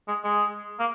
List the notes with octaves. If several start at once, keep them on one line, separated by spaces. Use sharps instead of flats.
G#3
G#3
A#3